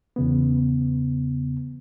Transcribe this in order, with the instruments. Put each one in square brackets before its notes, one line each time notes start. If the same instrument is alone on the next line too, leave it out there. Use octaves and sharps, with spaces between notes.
[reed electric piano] E2 C#3 B3